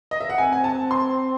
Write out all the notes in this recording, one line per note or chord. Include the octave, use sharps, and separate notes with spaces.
D#5
E5
F#5
C4 G#5
G#5
A5
C6